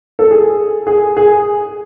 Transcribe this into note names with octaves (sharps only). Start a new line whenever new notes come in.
A4
G#4
G#4
G#4